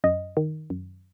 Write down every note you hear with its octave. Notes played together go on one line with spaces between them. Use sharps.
F#2 D#5
D#3
F#2